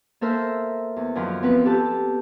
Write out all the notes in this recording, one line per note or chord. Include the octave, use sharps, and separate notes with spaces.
A#3 A4 A#4 C5 E5
E2
F#2 D#3 F3 F#3
F3 B3 C4 B4
G4 A4 B4 A5